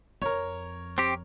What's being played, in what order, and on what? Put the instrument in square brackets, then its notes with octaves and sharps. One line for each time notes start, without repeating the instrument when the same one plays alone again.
[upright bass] F2 [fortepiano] A#4 C#5
[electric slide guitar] C4 G4